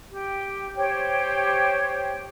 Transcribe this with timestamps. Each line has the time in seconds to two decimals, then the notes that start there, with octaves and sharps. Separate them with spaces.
0.11 G4
0.76 G4 C5 C#5 G5